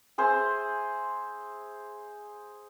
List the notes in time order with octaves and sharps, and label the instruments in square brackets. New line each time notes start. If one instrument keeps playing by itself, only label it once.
[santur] G#4 C5 E5